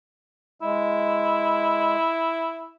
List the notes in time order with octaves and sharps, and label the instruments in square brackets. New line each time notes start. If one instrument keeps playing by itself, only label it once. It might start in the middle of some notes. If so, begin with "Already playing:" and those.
[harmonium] G#3 [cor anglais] E4